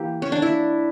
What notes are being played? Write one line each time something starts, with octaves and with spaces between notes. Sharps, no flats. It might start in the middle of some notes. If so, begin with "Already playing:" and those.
Already playing: E3 A#3 G4
C#4
D4
E4